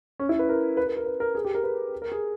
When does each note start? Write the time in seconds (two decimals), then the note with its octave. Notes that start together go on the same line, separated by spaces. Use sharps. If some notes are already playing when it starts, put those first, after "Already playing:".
0.20 C#4
0.29 E4
0.39 B4
0.49 A#4
0.77 B4
0.86 A#4
0.97 A#4
1.06 B4
1.20 A#4
1.35 G#4
1.45 G4
1.55 A#4
1.63 B4
2.02 A#4
2.12 G#4